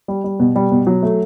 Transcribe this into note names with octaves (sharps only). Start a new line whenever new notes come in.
G3
G3
B2
G3
B2
F#3
A3